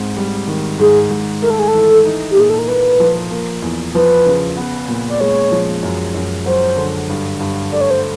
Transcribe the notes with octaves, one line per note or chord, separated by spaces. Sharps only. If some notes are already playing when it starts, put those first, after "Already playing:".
Already playing: G#2 C4
G3
D#3
G#2 G#4
G#2
A3 A#4
A4
G#4
A4
E3
D#4
G4
A#2 G#4
A4
A#4
A#3 B4
F3
A#3
E2
F3 B4
C#3
B3
A#2
D5
G#3 C#5
F3
F#2
F#2
F#3 C5
D3
G2
G2
A3 D5
C#5
C5